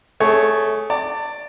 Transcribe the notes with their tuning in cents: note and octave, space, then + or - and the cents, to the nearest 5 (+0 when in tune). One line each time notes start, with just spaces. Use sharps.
A3 -15 G#4 +0 C#5 +0
D5 +0 A5 +40